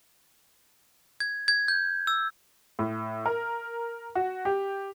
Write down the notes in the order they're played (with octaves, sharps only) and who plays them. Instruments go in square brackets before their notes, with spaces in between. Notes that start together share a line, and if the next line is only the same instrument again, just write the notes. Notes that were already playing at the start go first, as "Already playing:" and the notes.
[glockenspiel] G#6
G#6
G6
E6
[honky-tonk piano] A2
A#4
F#4
G4